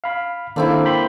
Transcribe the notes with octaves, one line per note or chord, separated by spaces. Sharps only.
F5 B5
D#3 A#3 C4 D4 E4 A4
G5 B5 C6